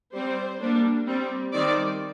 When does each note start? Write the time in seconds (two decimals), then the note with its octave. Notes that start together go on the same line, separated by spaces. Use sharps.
0.13 G3 C4 C5
0.60 G3 A#3 D4
1.06 G3 C4
1.53 D#3 G3 C4 D5